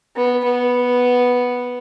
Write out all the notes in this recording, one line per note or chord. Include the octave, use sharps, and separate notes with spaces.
B3
B3